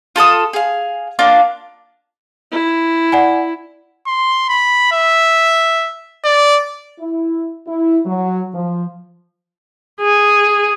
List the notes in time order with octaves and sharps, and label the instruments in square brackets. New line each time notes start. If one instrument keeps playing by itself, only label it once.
[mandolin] F4 A4 A5 D#6
G#4 F5
A#3 D4 F4
[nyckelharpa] E4
[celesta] D5 F#5 G#5
[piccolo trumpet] C6
B5
E5
D5
[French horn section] E4
E4
F#3
F3
[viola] G#4